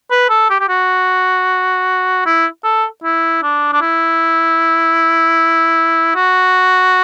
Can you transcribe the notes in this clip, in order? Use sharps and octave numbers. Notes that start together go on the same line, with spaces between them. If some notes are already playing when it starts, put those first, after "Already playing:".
B4
A4
G4
G4
F#4
E4
A4
E4
D4
D4
E4
F#4